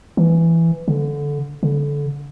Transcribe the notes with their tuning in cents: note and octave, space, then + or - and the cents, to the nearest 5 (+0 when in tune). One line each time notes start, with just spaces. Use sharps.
E3 +10
D3 -15
D3 -25